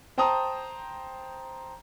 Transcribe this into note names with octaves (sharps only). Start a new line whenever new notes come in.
C5 G5 A5 A#5 D#6